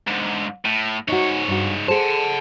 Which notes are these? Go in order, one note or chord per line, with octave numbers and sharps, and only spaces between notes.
G#2 D3
A2
G#2 D#4 F#4 C#5
G2 F#4
G#4 A4 C5 F#5 A5